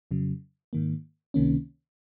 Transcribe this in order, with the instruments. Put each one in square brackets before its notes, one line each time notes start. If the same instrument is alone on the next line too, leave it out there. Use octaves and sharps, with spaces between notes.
[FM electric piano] F2 C#3 F#3
G#2 D#3 A#3
C#2 C3 D#3 A#3 C#4